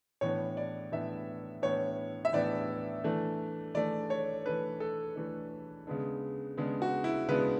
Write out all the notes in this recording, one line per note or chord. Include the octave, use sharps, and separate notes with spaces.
A2 E3 B3 D4 C#5
D5
A2 E3 B3 D4 E5
A2 E3 B3 D4 C#5
E5
A2 E3 B3 D4 D5
E3 A3 D4
E3 A3 D4 D5
C#5
E3 A3 D4 B4
A4
E3 A3 D4
C#3 G#3 B3 D4
C#3 G#3 B3 D4
F#4
E4
C#3 G#3 B3 D4 B4